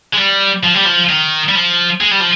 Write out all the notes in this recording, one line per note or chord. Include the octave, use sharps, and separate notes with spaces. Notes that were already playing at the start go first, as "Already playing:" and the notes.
G#3
G3
F3
G3
F3
D#3
G3
F3
G#3
G3
F3